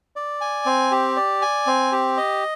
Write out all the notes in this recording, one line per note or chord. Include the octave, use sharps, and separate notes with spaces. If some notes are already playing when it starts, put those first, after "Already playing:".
D5
G#5
C4
G4
D5
G#5
C4
G4
D#5